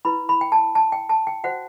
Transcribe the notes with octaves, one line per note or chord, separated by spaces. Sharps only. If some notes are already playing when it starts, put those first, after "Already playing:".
E4 B4 B5
B5
G5
A5
A5
G5
A5
G5
F#4 C5 F#5